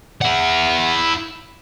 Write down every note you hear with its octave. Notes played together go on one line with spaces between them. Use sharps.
E4 F#5